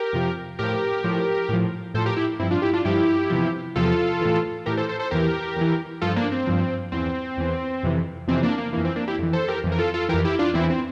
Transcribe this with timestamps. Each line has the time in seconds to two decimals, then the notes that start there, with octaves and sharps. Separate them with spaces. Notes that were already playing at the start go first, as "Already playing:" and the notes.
Already playing: G4 A#4
0.13 F2 C3 F3
0.59 A2 F3 G4 A#4
1.04 A2 F3
1.49 A2 F3
1.94 A2 F3 A4 C5
2.06 G4 A#4
2.17 E4 G4
2.39 G2 C4 E4
2.43 F3
2.51 D4 F4
2.62 E4 G4
2.73 D4 F4
2.85 G2 F3 E4 G4
3.30 E2 C3 F3
3.76 E2 C3 F3 F4 A4
4.21 A2 E3
4.66 A2 E3 G4 A#4
4.77 A4 C5
4.89 A4 C5
5.00 A4 C5
5.11 E2 E3 G4 A#4
5.57 E2 E3
6.02 G2 F3 F4 A4
6.16 A#3 D4
6.32 C4
6.47 G2 F3
6.92 E2 E3 C4
7.38 E2 E3
7.83 F2 C3 E3
8.28 F2 C3 E3 C4
8.43 A#3 D4
8.58 A#3
8.73 E3 A#3
8.77 F2
8.85 C4
8.96 A#3 D4
9.08 E4 G4
9.19 F2 E3
9.33 A4 C5
9.44 A4
9.48 G4 A#4
9.64 F2 E3
9.72 A#4
9.79 F4 A4
9.94 F4 A4
10.09 F2 E3 G4 A#4
10.25 E4 G4
10.39 D4 F4
10.54 E2 E3 C4 E4
10.70 C4